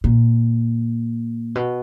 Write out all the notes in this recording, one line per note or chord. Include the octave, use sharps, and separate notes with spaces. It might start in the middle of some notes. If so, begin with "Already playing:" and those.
A#2
B2